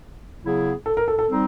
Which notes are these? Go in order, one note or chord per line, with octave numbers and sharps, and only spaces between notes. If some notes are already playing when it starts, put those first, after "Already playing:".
C#3 F#3 B3 E4 G#4
A4
A#4
A4
A4
G3 C4 D#4